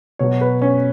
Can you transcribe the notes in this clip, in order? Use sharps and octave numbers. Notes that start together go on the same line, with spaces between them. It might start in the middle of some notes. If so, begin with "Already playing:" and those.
B2 F#3 C#5
B4
C#4